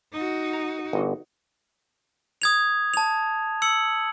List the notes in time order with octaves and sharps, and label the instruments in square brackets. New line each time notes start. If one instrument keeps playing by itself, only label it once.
[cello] D#4 F#4
[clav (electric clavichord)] A#5
G1
[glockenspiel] D#6 G#6 F7
A5 F7
E6 C#7 F#7